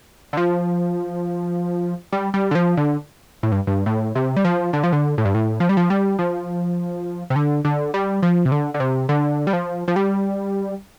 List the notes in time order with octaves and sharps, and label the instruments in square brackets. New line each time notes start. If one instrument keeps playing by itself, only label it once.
[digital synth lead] D3
F3
G3
G3
D3
F3
D3
A2
G2
G2
A2
C3
G3
F3
D3
F3
D3
A2
G2
A2
F3
G3
F3
G3
F3
C3
D3
D3
G3
F3
C3
D3
D3
C3
D3
G3
F3
F3
G3